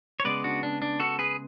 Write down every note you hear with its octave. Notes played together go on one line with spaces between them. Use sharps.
C#5
C#3 G#3 B3 B4 D5
D4 F#4
D4
D4
F#4 A4
G#4 B4